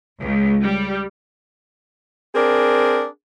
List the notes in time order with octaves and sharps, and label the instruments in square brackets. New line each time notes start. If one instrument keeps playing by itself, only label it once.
[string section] C#2
G3
[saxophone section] C4 D4 G#4 A#4